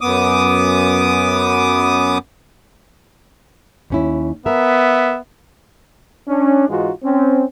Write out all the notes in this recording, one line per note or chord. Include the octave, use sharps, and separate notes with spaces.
F#2 B3 D6 D#6
D#2 C#4 E4
B3 A#4 E5
C#4 D4
G#2 E3 G#3 D#4 F4 F#4
C4 C#4